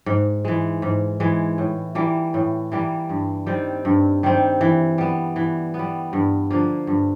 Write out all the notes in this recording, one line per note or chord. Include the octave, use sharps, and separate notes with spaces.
G#2
E3 G#3
G#2
E3 G#3
A2
E3 G3 A#3
A2
E3 G3 A#3
G2
D#3 G3 C4
G2
D#3 G3 C4
E3
G3 B3
E3
B3
G3
G2
D3 F3 A#3
G2